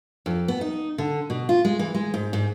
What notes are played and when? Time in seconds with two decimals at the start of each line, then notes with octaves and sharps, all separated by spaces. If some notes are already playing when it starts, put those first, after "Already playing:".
0.26 F2
0.48 B3
0.61 D#4
0.98 D3
1.30 B2
1.49 F4
1.65 G#3
1.79 E3
1.94 G#3
2.14 G#2
2.33 G#2